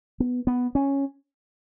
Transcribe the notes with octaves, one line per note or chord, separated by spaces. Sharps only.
B3
B3
C#4